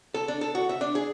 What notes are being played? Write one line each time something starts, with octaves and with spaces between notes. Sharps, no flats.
A4
D4
A4
F#4
E5
D4
G#4